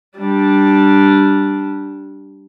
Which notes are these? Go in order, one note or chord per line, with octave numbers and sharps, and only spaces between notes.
G3 D4